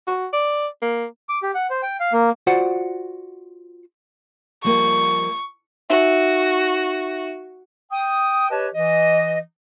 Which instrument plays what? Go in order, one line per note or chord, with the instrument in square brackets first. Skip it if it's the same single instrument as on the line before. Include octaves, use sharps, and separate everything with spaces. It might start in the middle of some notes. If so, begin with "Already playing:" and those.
[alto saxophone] F#4
D5
A#3
[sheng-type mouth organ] D6
G4
F#5
C5
G5
F5
A#3
[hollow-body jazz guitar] F4 F#4 C5 D5 F#5
[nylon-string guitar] F3 G3 A#3 [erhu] C#6
[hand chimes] D#4 E5 [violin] F#4
[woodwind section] G5 D#6
G4 B4 C#5 D#5 A5
E3 D#5